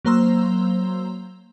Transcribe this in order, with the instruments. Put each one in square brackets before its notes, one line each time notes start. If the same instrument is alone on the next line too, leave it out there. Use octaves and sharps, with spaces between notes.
[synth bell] F#3 A#3 C5 A#5 C6 E6